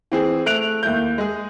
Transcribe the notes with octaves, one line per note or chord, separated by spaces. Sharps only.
E3 C4 G#4
A3 F#6 D7 F7
D#2 E4 G6
G#3 G#4